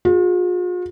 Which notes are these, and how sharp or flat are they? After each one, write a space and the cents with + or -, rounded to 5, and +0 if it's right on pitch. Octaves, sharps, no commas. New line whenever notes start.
F4 +45 G#4 -20